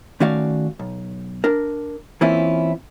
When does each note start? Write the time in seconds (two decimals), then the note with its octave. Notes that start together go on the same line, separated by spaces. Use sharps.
0.20 D#3 A3 C#4 F#4 D5 F5
0.79 B1
1.44 D4 A#4
2.21 E3 A#3 C4 C#4 E4 F4